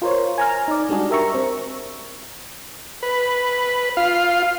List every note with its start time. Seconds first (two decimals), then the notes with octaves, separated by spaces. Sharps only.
0.02 F4 A#4 C5 C#5
0.38 G#5 A#5 F6
0.68 D#4 D5
0.89 G3 G#3 D4 F#4 G#4
1.10 G4 A#4 E5 A#5 C#6
1.34 C4
3.03 B4
3.97 F4 F5